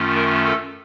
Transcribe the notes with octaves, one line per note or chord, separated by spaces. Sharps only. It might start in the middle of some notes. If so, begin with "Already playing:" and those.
Already playing: F#2 D#3 A3 C#4 F4
A#4
A4